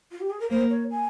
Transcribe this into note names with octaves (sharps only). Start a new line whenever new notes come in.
F4
G4
G#4
A#4
A#3 C5
C#5
G#5